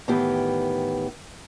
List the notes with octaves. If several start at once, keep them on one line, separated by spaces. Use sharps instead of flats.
A2 D#3 E3 B3 G4